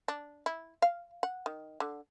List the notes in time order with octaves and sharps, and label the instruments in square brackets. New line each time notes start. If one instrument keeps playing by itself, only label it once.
[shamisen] D4
E4
F5
F#5
D#3
D3